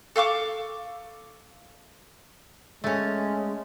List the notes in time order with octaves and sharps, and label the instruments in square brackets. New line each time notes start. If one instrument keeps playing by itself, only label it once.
[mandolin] A4 F5 C#6 D6
[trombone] G#3 [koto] A3 C#4